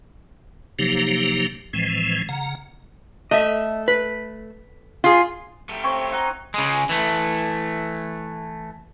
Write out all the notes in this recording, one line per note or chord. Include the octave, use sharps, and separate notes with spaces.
C3 F3 F#3 A#3 D#4 G4
A2 E3 F3 G#3 C4
C#3 F#5 A#5
A3 D#5 E5
B4
F4 G#4
A3 G4
C4 C#5 C#6
D#4 F#5
C#3 G#3
E3 A3